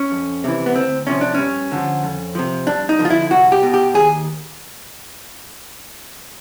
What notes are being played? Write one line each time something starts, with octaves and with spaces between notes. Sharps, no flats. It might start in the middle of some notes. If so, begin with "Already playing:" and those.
Already playing: C#4
F2
C3 E3
B3
D2 C4
C3 F3 C#4
D4
G2 C#4
D3 F3
F2
C3 F3
G2 D4
D#4
D3 F3
F4
E4
C2 F#4
G4
B2
G4
D#2 G#4